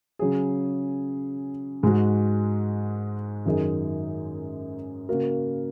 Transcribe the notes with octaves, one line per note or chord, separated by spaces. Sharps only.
C#3 F#3 C#4 G#4
G#2 G#3 F#4
F#2 D#3 F#3 D#4 G#4
C#3 A#3 F#4 A#4